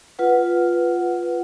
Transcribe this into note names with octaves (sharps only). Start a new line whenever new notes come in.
F4 B4 F#5